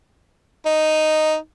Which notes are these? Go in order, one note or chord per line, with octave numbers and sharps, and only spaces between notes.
D#4